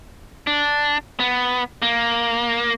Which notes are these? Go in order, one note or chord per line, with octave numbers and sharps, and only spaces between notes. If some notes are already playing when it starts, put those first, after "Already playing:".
D4
B3
A#3